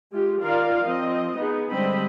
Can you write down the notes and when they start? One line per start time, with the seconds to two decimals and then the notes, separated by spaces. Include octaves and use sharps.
0.13 G#3 F4 G4
0.43 D#3 F4 A#4 D5 F5
0.85 F3 C4 D#5
1.38 B3 D#4 G#4
1.71 D3 G3 G#3 C4 D#5 B5